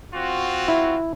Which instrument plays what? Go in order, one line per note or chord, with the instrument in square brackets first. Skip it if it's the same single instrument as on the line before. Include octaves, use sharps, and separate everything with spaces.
[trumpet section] C4 F4 F#4
[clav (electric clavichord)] E4